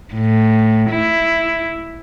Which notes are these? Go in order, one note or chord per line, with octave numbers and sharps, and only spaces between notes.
A2
E4